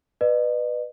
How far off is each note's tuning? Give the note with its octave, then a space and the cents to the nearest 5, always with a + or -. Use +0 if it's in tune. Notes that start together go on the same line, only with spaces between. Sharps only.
B4 +0 D#5 -45